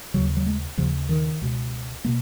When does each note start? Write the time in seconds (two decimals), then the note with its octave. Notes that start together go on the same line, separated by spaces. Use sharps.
0.14 D#2 C#3 F#3
0.37 F#3
0.46 G#3
0.77 D#2 C#3 F3
1.09 D#3
1.41 C#2 B2
2.04 B2 A#3